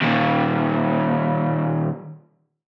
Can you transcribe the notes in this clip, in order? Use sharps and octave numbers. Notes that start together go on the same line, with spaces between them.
D#2 A#2